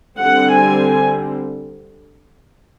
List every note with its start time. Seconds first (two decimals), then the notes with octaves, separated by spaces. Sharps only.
0.18 D3 G3 C4 F#5
0.58 G#5